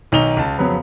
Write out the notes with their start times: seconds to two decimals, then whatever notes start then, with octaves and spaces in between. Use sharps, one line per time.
0.12 B1 D#3 D#5 F7 G7
0.37 C#2 A5
0.58 F2 C#3 F#3 B3